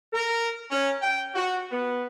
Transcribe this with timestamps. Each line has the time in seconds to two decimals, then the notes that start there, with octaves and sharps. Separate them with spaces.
0.13 A#4
0.71 C#4
1.02 G5
1.35 F#4
1.71 B3